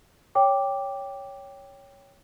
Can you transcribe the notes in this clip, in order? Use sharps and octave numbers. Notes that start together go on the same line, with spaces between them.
C#5 G5 D6